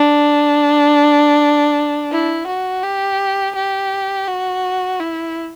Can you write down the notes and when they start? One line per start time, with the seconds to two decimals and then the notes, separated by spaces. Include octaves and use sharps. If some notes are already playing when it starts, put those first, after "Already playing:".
Already playing: D4
2.11 E4
2.47 F#4
2.83 G4
3.55 G4
4.27 F#4
5.00 E4